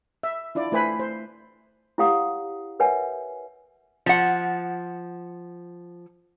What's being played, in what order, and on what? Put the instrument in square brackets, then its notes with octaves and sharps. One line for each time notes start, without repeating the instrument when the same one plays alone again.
[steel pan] E5
D4 E4 F4 D5
A3 E4 B4 C5 G#5 B5
C5
[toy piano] E4 G4 C#5 F5 F#5 D#6
A#4 B4 C#5 E5 F#5 G#5
[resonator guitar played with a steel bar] F3 F#5